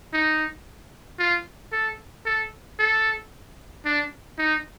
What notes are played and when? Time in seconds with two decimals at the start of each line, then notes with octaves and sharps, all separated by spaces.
0.13 D#4
1.19 F4
1.72 A4
2.26 A4
2.79 A4
3.85 D4
4.38 D#4